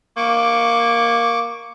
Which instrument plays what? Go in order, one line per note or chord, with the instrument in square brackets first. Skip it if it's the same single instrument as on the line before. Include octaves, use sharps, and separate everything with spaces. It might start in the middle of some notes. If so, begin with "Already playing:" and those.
[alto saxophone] A#3 [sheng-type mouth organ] C#6 D6